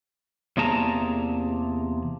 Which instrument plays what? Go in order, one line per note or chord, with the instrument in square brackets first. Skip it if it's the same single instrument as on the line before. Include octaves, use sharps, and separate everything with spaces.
[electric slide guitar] E2 C3 A#3 G#4 A5 A#5